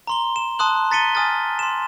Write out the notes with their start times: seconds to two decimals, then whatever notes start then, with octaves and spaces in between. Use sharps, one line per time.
0.07 A#5 C6 G7
0.36 E7
0.59 A5 C6 D#6 F#6 F#7
0.91 A#5 A6 B6 C#7 D#7 G7
1.15 G#5 D#6 F6 A6
1.59 C6 E7